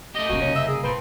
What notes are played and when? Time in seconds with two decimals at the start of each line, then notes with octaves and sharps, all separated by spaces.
0.15 D#2 A3 G4 D#5
0.29 C2 A#3 B3 C#4 F#4
0.42 F#1 C#4
0.56 E5
0.68 G#4
0.83 A#2 A3 C4 B4